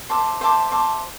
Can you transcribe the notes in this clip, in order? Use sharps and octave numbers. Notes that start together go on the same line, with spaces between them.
C5 E5 A5 D6
C5 E5 A5 D6
C5 E5 A5 D6